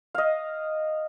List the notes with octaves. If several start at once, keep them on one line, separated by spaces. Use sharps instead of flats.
D#5 F5